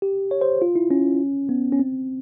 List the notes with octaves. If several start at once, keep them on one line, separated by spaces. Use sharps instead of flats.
G4
C#5
C5
F4
E4
C#4
B3
C#4
C4